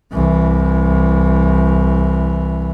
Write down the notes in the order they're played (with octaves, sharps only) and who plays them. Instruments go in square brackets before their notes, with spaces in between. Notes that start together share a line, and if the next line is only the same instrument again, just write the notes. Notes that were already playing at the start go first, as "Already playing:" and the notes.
[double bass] C2 E3